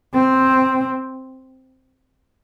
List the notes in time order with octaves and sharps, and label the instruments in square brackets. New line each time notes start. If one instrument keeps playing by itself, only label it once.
[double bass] C4